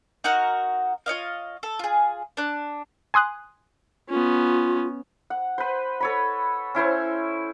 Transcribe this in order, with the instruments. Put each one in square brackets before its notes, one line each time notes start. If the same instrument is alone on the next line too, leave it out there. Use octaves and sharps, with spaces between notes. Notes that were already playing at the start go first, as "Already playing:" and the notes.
[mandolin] D#4 F#4 A#4 F#5
F4 C#5 D#5 F5
A4
F4 G#4
D4 F#6
[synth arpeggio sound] G#5 C6 D#6 F#6
[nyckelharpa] B3 C#4 [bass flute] F4
[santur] F#5
B4 C5
A4 C#5 B5
C#4 E4 C5 C#5